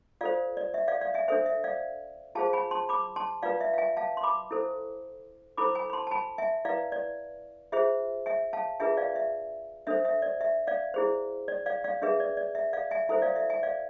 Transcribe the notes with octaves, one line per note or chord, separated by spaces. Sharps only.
F4 A4 C5 D5 F5
D5
E5
D5 F5
D5 F5
E5 G#5
D4 A4 C5 E5 G#5
E5
D5 F5
F4 G#4 C5 F5 A5
G#5 B5
A5 C6
B5 D6
A5 C6
F4 B4 D5 F5
E5
F5
E5 G#5
F5 A5
C6
B5 D6
E4 A4 C5
E4 A4 C5 B5 D6
G#5 B5
B5
A5 C6
A5
G#5 B5
E5 G#5
E4 B4 D5 F5
D5
F4 G#4 C5 E5
E5 G#5
F5 A5
D4 F4 G#4 B4 E5 G#5
D5 F5
E5
D4 A4 C5 E5
E5
D5
E5
D5 F5
E4 G#4 C5
D5
D5 F5
D5 F5
D4 G#4 B4 E5
D5
D5
E5
D5 F5
E5 G#5
E4 A4 C5 E5 G#5
D5 F5
E5
E5 G#5
D5 F5